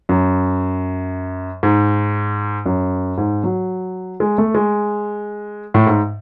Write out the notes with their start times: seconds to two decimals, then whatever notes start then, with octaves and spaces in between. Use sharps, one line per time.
0.09 F#2
1.63 G#2
2.66 F#2
3.18 G#2
3.44 F#3
4.20 G#3
4.38 A3
4.55 G#3
5.74 A2
5.87 G#2